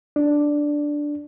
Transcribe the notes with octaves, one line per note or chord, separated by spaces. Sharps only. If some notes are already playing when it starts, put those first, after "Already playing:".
D4